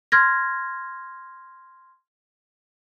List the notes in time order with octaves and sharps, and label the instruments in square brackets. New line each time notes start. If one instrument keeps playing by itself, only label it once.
[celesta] C6 F6 G#6 A#6